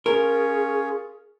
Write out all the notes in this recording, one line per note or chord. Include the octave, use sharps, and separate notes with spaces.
C#4 F4 G#4 A#4 C#5